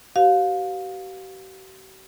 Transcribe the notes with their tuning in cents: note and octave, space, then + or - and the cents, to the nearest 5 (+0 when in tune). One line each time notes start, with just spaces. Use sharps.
G4 -45 B4 +0 F5 +25